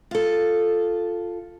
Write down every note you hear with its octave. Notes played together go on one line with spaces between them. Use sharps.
F4 A4